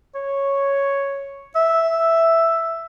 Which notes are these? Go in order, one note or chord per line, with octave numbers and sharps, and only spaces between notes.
C#5
E5